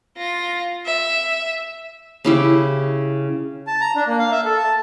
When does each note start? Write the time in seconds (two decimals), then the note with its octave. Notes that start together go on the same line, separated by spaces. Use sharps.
0.17 F4 A#6
0.85 E5
2.25 C#3 E4 G4
3.67 A5
3.81 A#5
3.95 D4
4.07 A#3
4.19 F5
4.31 E5
4.45 A4
4.58 A5